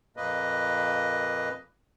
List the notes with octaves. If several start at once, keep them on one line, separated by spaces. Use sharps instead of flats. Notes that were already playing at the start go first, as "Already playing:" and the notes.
F2 A#2 A#3 B4 D#5